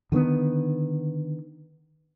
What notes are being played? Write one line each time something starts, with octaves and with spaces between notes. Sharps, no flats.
D3 D#3 A#3 B3